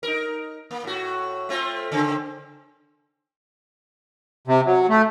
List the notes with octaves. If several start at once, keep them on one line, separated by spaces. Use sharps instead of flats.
D#4 A#4
A#3
A2 F#4
A3 C4 F4
C#3 C4
C3
F#3
A3